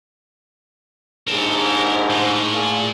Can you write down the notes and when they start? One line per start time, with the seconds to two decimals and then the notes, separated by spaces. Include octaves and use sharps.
1.28 A#1 D#2 G#2 A#4 A5
2.10 A2
2.53 A#2 F4 G#4